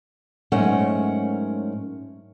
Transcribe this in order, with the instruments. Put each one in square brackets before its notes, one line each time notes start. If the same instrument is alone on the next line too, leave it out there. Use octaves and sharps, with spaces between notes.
[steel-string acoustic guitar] G#2 F#3 A3 C#4 A#4 F#5